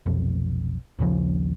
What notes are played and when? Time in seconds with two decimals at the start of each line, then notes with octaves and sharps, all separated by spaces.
0.06 F1 B1 F2
0.99 A#1 D#2 C#3 F3